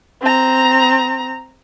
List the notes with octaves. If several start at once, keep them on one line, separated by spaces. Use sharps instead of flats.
C4 A#5